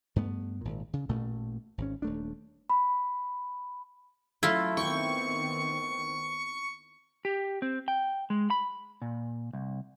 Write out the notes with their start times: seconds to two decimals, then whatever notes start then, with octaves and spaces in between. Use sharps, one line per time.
0.16 G2 A3 B3
0.61 G#1 A#2
0.93 C#3
1.09 A1 A#2 A3
1.78 G#1 C#4
2.02 D#1 A3 D4
2.70 B5
4.43 F#3 A3 E4 F4 A4
4.77 D#3 B3 C4 G5 C#6
7.25 G4
7.62 C4
7.88 G5
8.30 G#3
8.50 B5
9.02 A#2
9.53 C2